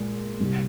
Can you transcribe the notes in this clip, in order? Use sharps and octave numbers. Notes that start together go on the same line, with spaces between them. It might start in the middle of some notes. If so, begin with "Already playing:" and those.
Already playing: A#2 G#3
C2 C3 G3